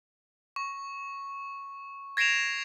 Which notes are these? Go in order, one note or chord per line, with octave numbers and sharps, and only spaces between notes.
C#6
G#6 A#6 C7 D7 E7 F7